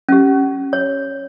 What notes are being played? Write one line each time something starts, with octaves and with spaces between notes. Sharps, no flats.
C#4 G4
C#5